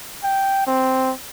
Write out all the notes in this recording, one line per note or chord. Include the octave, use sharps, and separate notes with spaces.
G5
C4